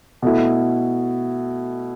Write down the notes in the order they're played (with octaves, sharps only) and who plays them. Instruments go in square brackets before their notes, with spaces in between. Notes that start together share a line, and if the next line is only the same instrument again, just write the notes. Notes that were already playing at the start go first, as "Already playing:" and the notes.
[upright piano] B2 A3 E4